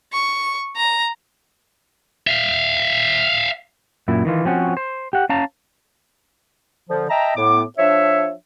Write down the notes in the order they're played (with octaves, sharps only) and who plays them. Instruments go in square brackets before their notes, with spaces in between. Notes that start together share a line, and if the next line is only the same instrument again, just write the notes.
[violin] C#6
A#5
[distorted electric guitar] E5 F5
[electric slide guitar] F#2 A#2 E4
D#3 E3 F4
F3 C4 C#4 F#4
C5
G4 F#5
C#4 F5 A5 A#5
[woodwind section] D3 F3
D#5 E5 G5 A5 A#5
A2 B3 D6
F3 D4 C#5 E5